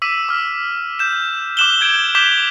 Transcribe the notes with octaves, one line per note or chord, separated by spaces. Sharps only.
D6 E6 B6 D#7
D6 F6
G6 E7
D6 E6 F#6 E7 F#7 G7
G6 G#6 D7
D6 G6 B6 E7 F7 G7